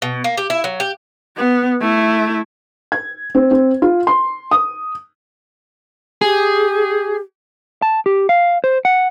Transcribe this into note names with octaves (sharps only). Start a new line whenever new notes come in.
B2
A#3
G4
E4
F#3
G4
B3
A3 E4
G#6
C4
C4
F4
C6
D#6
G4 G#4
A5
G4
F5
C5
F#5